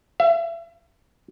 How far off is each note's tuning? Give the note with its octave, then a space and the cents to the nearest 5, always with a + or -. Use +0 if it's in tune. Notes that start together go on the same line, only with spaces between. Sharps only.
E5 +35